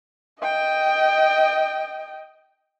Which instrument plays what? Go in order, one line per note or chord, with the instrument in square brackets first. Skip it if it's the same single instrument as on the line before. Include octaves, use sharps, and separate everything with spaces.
[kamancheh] D#5 G5